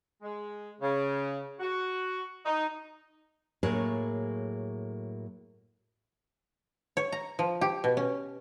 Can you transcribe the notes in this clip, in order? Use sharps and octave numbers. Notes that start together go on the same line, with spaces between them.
G#3
C#3
F#4
D#4
A2 F#3 A#3 G#4 C#5
C#5
A#5
F3
G4
B2
C#4